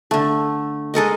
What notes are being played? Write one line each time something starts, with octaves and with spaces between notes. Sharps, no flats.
D3 A3
G#3 A4 A#4 D#5